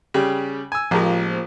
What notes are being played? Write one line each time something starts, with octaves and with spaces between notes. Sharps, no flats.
C#3 G3 G4
G#5 E6
A1 F3 G#3 A#3